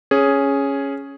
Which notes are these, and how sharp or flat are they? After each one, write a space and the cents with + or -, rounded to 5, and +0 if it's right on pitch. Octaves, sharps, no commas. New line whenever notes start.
C#4 +0 G#4 +0